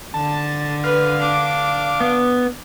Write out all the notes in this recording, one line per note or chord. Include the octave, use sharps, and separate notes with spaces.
D3 A5
B4 F5
D4 D6
B3